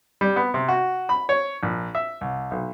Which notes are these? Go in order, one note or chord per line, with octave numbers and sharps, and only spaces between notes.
G3
B3
C3
F#4
B5
C#5
A#1
E5
C2
B1